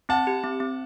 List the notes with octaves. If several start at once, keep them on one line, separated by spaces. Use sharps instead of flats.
C4 F#5 A5
G4
C4
C4